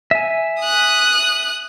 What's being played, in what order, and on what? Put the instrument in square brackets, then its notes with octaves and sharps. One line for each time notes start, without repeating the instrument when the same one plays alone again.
[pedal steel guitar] E5 G#5
[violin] D#6 F#6